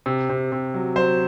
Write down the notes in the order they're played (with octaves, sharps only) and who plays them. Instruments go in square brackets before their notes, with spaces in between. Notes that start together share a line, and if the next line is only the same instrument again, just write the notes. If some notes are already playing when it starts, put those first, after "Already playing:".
[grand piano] C3
C3
C3
F#3
F#3 C5